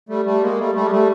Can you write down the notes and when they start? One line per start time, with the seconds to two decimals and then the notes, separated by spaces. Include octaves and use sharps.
0.09 G3 A3
0.25 G3 A3
0.41 G#3 A#3
0.59 G3 A3
0.75 G3 A3
0.85 G#3
0.91 G3 A3